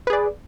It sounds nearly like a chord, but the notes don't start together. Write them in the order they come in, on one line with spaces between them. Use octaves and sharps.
B4 G#4 D5